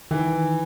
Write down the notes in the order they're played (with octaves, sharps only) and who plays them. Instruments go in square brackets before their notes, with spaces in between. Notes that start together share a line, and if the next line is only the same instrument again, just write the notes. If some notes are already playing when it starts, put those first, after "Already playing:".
[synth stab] D#3 [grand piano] E3